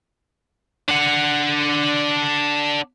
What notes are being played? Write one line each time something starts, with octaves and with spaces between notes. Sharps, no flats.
D4 F#5